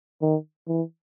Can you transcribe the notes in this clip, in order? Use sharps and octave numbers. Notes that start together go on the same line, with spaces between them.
D#3
E3